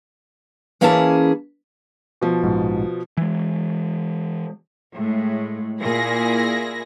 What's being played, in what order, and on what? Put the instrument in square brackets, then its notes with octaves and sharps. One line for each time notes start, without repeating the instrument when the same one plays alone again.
[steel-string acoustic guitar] E3 A#3 C#4 E4 G#4 A5
[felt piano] B2 F3
[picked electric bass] A#1 G#2
E3 G#3
[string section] A2 G#3
A#2 E4 G#4 A#6